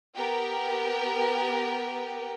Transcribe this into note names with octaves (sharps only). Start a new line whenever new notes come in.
B3 G4 A#4 G5